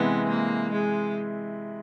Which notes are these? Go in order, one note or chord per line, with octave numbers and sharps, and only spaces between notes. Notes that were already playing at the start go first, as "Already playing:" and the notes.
Already playing: C3 E3 G#3 B3
A#3
G#3